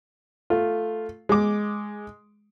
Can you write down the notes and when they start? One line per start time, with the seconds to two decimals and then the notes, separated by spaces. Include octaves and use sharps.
0.50 A3 F4
1.29 G#3 D6